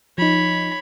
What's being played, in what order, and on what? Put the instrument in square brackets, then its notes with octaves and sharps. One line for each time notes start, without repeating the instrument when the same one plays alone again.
[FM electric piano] F3 D#4 [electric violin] C#5 B5